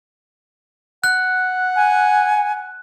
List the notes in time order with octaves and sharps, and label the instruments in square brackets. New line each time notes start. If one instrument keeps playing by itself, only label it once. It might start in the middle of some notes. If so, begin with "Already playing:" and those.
[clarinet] F#5 [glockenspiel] F#6
[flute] G#5